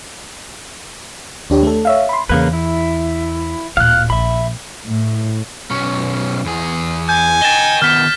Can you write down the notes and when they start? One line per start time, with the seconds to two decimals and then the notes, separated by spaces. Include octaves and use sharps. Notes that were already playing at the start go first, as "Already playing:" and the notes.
1.50 D#2 D4 G4 C#5
1.63 A3 A4
1.85 C#5 E5 F5
2.09 B5 C6
2.29 E2 C#3 A#3 B4
2.53 E4
3.77 D1 A#2 F5 F#6
4.10 A#1 E5 B5
4.86 A2
5.70 B1 C#4
6.46 E2 G#4
7.09 G#5 G6
7.42 D#5 G5 A6 E7 G7
7.82 D#3 B3 F6 B6 E7